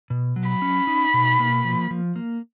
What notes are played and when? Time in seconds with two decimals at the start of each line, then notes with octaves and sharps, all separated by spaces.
0.10 B2
0.36 F#3
0.49 B5
0.62 C#4
0.87 D#4
1.14 B2
1.39 A#3
1.65 F3
1.91 F3
2.16 A#3